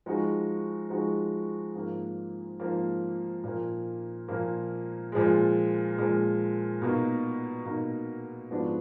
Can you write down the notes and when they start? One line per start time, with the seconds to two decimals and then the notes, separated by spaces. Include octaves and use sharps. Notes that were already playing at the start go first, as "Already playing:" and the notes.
0.06 F3 G#3 D#4 F#4
0.90 F3 G#3 D#4 F#4
1.75 G#2 F3 A#3
2.60 G#2 F3 A#3
3.44 A#2 F3 A#3
4.28 A#2 F3 A#3
5.12 A#2 F3 G#3
5.98 A#2 F3 G#3
6.82 B2 A#3 D#4
7.66 B2 A#3 D#4
8.51 G#2 F3 B3 D4 F#4